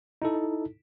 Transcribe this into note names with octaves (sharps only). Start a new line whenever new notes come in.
D#4 E4 A4